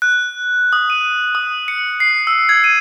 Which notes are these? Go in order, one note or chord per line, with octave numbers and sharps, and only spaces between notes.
F#6
D#6
D#7
D#6
C#7
C7
E6
G#6
D#7